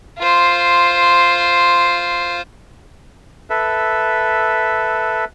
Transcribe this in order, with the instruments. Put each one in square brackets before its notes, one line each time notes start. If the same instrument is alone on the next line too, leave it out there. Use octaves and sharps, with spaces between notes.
[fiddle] F4 C5
[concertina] A4 B4 E5